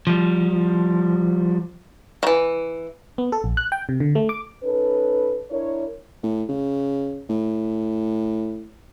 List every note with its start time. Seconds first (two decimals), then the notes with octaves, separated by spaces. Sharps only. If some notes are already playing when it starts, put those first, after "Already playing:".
0.07 F3 G3
2.23 D#3 E3
3.18 B3
3.32 A4
3.44 A#1
3.57 F#6
3.72 G5
3.89 C3
4.00 D3
4.15 A3
4.29 D6
4.63 C#4 D#4 A4 B4
5.51 D4 E4 A#4 C#5
6.23 A2
6.49 C#3
7.29 A2